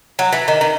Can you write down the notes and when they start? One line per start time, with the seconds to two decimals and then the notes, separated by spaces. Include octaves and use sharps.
0.19 F#3
0.33 E3
0.48 D#3
0.61 D#3